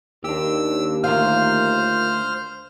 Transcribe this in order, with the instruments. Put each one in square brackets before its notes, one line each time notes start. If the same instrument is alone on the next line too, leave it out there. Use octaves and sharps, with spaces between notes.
[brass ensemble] D#2 [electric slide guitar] D4 G4 [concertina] E6
[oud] D2 F5 [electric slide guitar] F4 A#4 [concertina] C5 F6